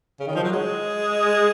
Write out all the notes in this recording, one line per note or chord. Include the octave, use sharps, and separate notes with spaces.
C#3
D#3
F3
F#3
G#3